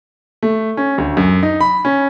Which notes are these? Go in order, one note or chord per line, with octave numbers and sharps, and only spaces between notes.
A3
C#4
D2
F#2
D#4
B5
C#4